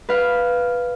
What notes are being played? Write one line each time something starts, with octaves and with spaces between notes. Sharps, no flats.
B4 F5